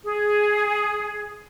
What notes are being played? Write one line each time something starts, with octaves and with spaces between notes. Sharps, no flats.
G#4